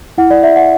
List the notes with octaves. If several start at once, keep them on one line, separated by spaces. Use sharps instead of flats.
E4 F#5
D5
D5 E5
F#5